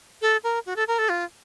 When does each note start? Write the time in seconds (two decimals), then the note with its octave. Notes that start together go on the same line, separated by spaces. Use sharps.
0.22 A4
0.44 A#4
0.66 F#4
0.76 A4
0.88 A#4
0.99 A4
1.09 F4